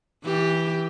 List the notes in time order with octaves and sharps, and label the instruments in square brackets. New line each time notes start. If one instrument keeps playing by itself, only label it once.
[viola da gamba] E3 G4